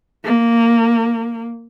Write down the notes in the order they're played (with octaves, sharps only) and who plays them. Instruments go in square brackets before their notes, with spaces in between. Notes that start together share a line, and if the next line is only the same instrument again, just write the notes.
[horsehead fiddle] A#3